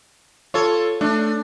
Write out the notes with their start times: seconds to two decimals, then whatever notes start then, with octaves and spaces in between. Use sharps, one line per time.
0.54 F4 A4 C#5
1.01 A3 D4